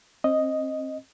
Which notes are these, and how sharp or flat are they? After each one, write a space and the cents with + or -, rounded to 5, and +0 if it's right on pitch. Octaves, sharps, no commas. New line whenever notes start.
C4 +30 D#5 +0